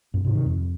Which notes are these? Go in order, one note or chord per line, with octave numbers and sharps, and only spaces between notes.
F#2 A#2
G#2 C3
C3 D#3
F2